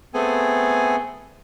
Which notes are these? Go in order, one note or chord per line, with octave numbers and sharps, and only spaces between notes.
A3 B3 C4 G#4 A4 G#5